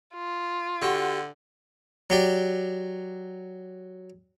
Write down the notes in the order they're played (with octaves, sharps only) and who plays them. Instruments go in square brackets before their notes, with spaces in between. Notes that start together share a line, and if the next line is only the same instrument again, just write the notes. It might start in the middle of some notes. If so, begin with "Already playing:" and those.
[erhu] F4
[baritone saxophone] D3 [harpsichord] F#4 G4
[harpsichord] F#3 G4 D5